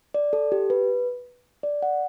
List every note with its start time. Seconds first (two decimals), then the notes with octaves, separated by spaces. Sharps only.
0.14 D5
0.33 A4
0.52 G4
0.70 B4
1.63 D5
1.82 F#5